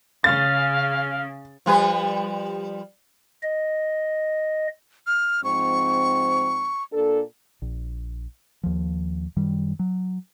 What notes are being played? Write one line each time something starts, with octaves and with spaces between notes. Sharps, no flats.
C#3 F5 A6
F3 G3 B4
D#5
F6
G#2 F3 C4 C#6
A#2 D4 A4
A#1
D#2 F3
F#2 D#3 G3
F#3